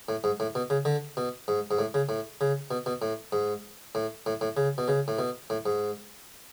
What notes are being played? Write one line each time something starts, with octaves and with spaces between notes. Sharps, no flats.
A2
G#2
A2
B2
C#3
D3
B2
G#2
G#2
A2
C#3
A2
C#3
B2
B2
A2
G#2
A2
A2
A2
C#3
B2
C#3
A2
B2
A2
G#2